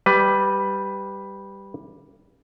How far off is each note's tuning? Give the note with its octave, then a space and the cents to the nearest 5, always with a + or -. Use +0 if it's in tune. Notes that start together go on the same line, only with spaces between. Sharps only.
G3 +0 B4 +15